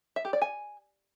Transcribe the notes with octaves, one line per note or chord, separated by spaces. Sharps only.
E5
G4
D5
G#5